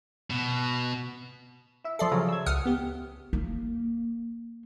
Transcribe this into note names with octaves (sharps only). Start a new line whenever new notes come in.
B2
E4 E5
F3 A4 D5 E5 C7
C#3 F#3
E6 G#6
C#2 F#5 D#6 F6
B3 G4
A#3